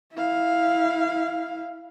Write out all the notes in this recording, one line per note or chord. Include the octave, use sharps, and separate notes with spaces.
E4 F5